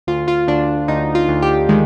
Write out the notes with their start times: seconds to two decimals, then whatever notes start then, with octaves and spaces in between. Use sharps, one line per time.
0.07 D2 F4
0.28 F4
0.48 D2 D4
0.88 D2 D#4
1.15 F4
1.29 D2
1.42 G4
1.69 D#3 G#3